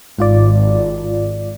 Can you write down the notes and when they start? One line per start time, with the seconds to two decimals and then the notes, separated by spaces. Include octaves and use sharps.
0.19 G#1 G#2 F4 D5